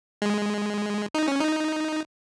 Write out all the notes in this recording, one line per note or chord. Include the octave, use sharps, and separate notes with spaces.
G#3
D#4
C#4
D#4